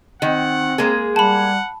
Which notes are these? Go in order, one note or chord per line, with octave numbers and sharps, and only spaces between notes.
D#3 C4 F#5
G#3 A#3 G#4
G3 F#5 A5 B5